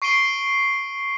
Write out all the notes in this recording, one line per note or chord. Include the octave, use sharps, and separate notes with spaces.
C#6 C7 D7 D#7 G7